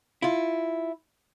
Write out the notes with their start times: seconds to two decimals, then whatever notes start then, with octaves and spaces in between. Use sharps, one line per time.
0.22 E4 F4